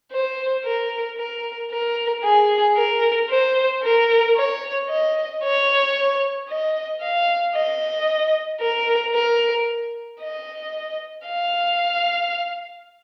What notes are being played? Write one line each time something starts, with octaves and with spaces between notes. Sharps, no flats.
C5
A#4
A#4
A#4
G#4
A#4
C5
A#4
C#5
D#5
C#5
D#5
F5
D#5
A#4
A#4
D#5
F5